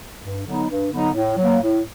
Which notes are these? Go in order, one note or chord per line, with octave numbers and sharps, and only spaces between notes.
G2
D3 F#3 B3 D#4
G2
D3 F#3 B3 D#4
A2
F#3
A#3
A2